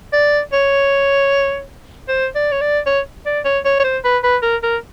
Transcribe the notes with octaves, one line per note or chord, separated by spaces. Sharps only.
D5
C#5
C5
D5
C#5
D5
C#5
D5
C#5
C#5
C#5
C5
B4
B4
A#4
A#4